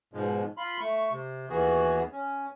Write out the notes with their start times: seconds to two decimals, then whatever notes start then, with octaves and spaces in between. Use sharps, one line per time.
0.14 G#2 B2 F3 G#3
0.57 F4 B5 C6
0.80 A3 C#6
1.11 C3
1.50 D#2 E3 B3 F#4 G#4
2.12 C#4